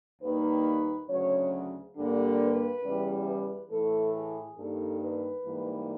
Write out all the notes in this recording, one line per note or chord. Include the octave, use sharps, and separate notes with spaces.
D#2 D#3 G3 A#3 B4
D2 C#3 F#3 C#5
G2 D3 G3 A#3
B4
E2 C#3 E3 G3
B4
A2 E3 A3 A4
G#4
G2 D#3 G3 A#3 A4
B4
G#2 E3 G3 A#3